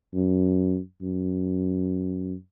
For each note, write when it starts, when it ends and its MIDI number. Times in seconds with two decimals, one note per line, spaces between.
0.14 0.78 42
1.02 2.34 42